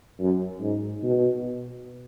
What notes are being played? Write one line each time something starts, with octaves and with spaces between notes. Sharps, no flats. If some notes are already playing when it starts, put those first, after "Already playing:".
F#2
G#2
B2